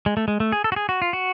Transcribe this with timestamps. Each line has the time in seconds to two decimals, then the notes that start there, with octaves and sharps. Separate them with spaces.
0.06 G#3
0.17 A3
0.28 G#3
0.40 A3
0.52 G#4
0.64 A4
0.72 F#4
0.76 G#4
0.89 F#4
1.02 F4
1.13 F#4